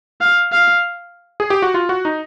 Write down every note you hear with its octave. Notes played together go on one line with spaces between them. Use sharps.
F5
F5
G#4
G4
F#4
F4
F#4
D#4